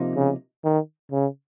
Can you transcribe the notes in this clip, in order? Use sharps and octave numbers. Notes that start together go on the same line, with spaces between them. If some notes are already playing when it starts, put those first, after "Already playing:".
Already playing: C3 F3 A#3 D#4
C#3
D#3
C#3